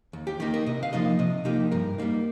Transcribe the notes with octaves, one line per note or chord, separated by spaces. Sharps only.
D#2
G4
D#3 A#3 D#4 G4
A#4
C3 D#5
F5
F3 A#3 D#4 D#5
C3 D#5
F3 A#3 D#4 G4
G2 A#4
G3 A#3 D#4